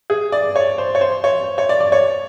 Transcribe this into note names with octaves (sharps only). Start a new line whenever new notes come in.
G#4
D5
C#5
C5
C#5
C5
C#5
C#5
D5
D5
C#5